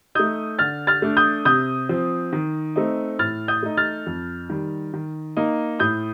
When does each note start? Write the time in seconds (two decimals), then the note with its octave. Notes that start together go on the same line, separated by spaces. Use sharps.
0.15 A3 D#4 D#6 G6
0.59 D3 F6 A6
0.87 F6 A6
1.02 A3 D4
1.17 D#6 G6
1.45 C3 D#6 G6
1.89 F3 C4
2.33 D#3
2.76 A3 C4 D#4
3.19 A2 F6 A6
3.48 D#6 G6
3.63 A3 D#4
3.77 F6 A6
4.06 F2
4.50 D#3 G3
4.93 D#3
5.37 A#3 D#4
5.79 A2 D#6 G6